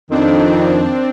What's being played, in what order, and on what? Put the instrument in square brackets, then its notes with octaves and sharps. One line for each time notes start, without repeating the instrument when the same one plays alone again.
[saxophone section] F2 D#3 [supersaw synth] C4 D4